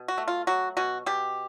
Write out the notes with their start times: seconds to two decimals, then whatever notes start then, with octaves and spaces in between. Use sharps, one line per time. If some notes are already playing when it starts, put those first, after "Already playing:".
Already playing: B2
0.08 F#4
0.18 A3
0.28 F4
0.47 F#3 F#4
0.77 B2 F#4
1.06 B2 G4